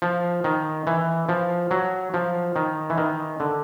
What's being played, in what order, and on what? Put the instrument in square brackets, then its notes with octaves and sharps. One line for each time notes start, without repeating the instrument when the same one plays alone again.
[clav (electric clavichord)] F3
D#3
E3
F3
F#3
F3
D#3
E3
D#3
D3